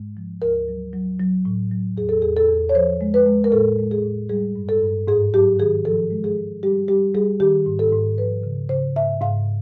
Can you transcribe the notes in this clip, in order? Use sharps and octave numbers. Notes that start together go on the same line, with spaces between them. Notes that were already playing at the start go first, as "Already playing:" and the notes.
Already playing: G#2 G#3
F3
D2 A#4
F#3
F#3
F#3
A2
F#3
E2 G#4
A4
E2 G#4
A4
E2
C#5
F3 C5
G#3
B4
G#3
A#4
A2 A4
G#3
G#4
A2
G3 G#4
G2
A4
G2
G#2 G#4
F#3 G4
D#3 G#4
F3 A4
G#3
G#4
G#3
G3 G4
G3 G4
G3 G#4
D#3 G4
G#2
A4
G#2
F3 B4
C#3
C#3 C5
G#2 E5
G#2 F5